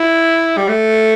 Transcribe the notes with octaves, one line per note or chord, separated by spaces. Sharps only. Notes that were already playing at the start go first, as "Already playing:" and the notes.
Already playing: E4
G3
A3